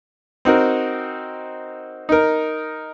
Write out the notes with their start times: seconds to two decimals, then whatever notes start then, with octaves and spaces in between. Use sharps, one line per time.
0.45 C4 D#4 F#4 A#4
2.09 D#4 A#4